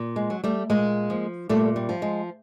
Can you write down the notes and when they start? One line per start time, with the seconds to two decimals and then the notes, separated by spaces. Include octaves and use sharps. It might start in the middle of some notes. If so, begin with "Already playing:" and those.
Already playing: A#2
0.16 G#3
0.30 F#3
0.44 G3 A3
0.70 A#2 G#3 A#3
1.10 F3
1.49 A#2 G3 A3
1.76 G3
1.89 F3
2.02 G#3